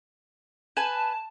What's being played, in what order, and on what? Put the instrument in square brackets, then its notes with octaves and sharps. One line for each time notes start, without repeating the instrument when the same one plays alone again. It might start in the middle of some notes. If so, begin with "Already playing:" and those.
[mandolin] B4 G#5 [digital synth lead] A5